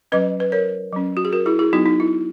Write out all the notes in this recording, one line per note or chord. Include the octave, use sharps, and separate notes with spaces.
F#3 C#4 B4 D#5
B4
A#4 C#5
F#3 C#4
F#4
G#4
F#4 A#4
E4 G#4
E4 G#4
F#3 B3 D#4 F#4
D#4
E4